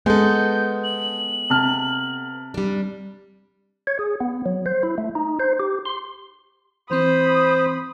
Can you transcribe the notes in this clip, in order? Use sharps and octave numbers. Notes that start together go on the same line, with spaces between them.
G#3 B3 A4 G6
F#7
C3 A5 F6
G3 D4
C#5
G#4
B3
F#3
C5
E4
A3
D#4
C5
G4
C6
E3 C4 C5 B5 D#6